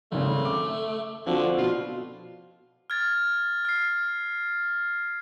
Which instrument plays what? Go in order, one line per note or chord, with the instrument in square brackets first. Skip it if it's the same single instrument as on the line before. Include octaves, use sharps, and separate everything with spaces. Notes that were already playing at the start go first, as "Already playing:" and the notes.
[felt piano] G#1 C#3 [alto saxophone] A3
[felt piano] D6
[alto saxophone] D3 [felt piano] F3 C4 F#4
[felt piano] B2 [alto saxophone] F4
[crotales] F6 G#6 A6
F6 C7